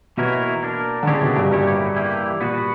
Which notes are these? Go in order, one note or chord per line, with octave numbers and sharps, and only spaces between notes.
B2 E3 A#3 E4 A#4 C#5
A#3 D4 A#4
D3
C#3 E3 A#3 D4 G4 C#5
B2
G2
G2 A#3 E4 G4 C#5
E3 A#3 E4 G4
A#2 B3 F#4 B4